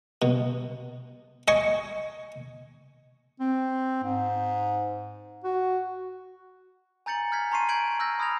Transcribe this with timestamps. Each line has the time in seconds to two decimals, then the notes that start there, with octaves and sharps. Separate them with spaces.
0.22 B2
1.48 D#5 G#5 C#6
3.40 C4
4.03 G#2
5.44 F#4
7.06 G#5 A#5 G6 A6 C#7 F#7
7.32 F6 G6 G#6 B6
7.51 A5 A#5 C6 C#6 C7 D#7
7.69 G6 G#6 C7 D7 F#7
7.99 E6 F6 G6 A#6
8.19 B5 D#6 F6 G#6 A#6 F7